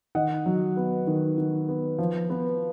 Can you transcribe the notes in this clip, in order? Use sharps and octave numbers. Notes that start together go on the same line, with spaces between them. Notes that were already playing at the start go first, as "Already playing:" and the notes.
D#3 D#5 F#5
F#3
B3
D#3
D#3
B3
F3
B3